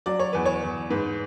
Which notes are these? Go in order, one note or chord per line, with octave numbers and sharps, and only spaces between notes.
F#3 D5
C#5
E2 B4
C#5
E2
G#2 B4